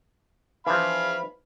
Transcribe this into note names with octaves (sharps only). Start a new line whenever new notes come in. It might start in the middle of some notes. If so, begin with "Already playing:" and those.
E3 F3 F5 B5